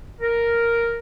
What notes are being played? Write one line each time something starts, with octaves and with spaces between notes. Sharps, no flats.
A#4